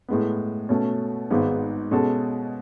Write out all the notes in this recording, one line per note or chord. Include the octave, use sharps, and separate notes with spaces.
A2 G#3 B3
B2 A3 C#4
G#1 G#2 G#3 B3
B2 G#3 C#4 F#4 A4